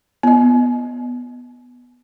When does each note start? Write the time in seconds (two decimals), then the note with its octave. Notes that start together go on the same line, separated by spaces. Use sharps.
0.23 B3 D#5